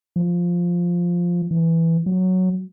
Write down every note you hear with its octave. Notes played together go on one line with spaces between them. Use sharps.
F3
E3
F#3